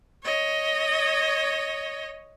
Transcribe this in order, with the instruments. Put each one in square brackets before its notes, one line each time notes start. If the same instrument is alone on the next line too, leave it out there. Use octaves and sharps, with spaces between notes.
[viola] C#5 D#5